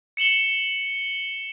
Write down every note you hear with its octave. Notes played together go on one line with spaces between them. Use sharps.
C#7 E7 F#7 G7